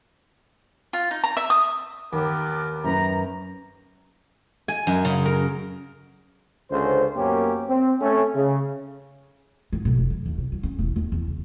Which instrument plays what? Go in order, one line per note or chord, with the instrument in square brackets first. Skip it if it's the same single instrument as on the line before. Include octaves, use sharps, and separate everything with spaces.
[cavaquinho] F4
D#4
A#5
E5
D#6
[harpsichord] D#2 [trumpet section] B3 A#4 D6
[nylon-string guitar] F#2 B4 [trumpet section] A#5
[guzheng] G#5
F#2
C#3
A#4
[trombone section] C#2 D3 C#4 C5
F#2 A#3 B3 C#4 G4
C4
A3 C#4
C#3
[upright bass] G#2
B1
F1
F#2
D#2
C3
F#3
C#4
E1
D#2
E2
C#3